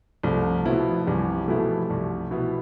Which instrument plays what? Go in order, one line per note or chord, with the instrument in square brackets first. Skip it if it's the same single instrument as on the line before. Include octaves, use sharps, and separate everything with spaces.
[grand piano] C2 [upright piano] F3 A3
[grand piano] B2 B3 E4 [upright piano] F3
[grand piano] C2 [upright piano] E3 G3
[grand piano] B2 B3 E4 [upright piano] F3 A3
[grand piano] C2
B2 B3 E4